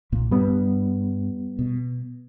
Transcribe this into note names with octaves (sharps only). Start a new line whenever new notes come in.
B1 A#2 A#3
G2 G3 B3
B2